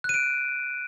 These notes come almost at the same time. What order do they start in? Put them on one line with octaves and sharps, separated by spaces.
F#6 D#7 D7